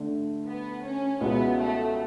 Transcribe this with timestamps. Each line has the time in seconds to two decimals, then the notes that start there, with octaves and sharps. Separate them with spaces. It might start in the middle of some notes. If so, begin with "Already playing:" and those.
Already playing: D3 A3 D4
0.46 B3
0.83 C#4
1.21 C#2 B2 G#3 B3 C#4 E4
1.59 A3